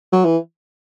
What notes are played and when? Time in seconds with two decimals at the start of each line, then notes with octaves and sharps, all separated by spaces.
0.13 F#3
0.25 E3